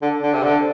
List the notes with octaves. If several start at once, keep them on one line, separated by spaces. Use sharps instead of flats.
D3
D3
C3
D3